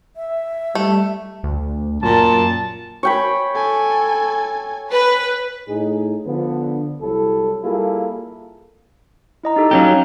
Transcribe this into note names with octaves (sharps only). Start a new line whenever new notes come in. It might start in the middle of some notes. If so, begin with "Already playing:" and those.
E5
G3 A3
D2
F#2 A#2 A5
C#5 G5 B5
A4 G#5
B4
A2 D#4 G#4
D3 F3 B3
C2 F#3 E4 A4
G3 A#3 E4 F4 G#4 A4
E4 D#5 A#5
D#4 G4 A4
F#3 C#4 G4 F5 A#5